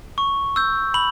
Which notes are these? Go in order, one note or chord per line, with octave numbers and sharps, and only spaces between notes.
C#6
E6 G6
B5 F#7